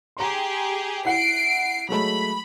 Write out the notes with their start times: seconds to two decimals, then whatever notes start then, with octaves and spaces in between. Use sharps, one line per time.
0.17 G4 G#4 A#5 C6
1.05 E4 F#5 C7 D7
1.89 F#3 G#3 A3 B5